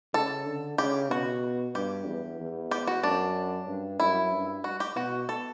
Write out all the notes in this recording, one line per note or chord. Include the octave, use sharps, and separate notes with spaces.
C#3 A4
D3
C#3 G4
B2 F#4
G2 G4
E2
E2
G4
F#4
F#2 D4
G2
F#2 E4
G2
F#4
G4
B2 F#4
A4